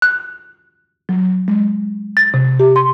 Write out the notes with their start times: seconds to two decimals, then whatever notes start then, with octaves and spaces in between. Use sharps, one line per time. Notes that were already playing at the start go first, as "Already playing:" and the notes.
0.02 F#6
1.09 F#3
1.48 G#3
2.17 A6
2.34 C3
2.60 G4
2.76 C6